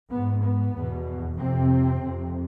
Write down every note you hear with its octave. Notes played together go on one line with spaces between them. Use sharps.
G#2 B3
B3
E2 B2
F2 C3 C4
F2 C3